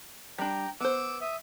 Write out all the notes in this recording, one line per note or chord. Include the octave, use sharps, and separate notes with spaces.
G3 D4 G5 A#5
B3 C5 D6 E6
E5 D#6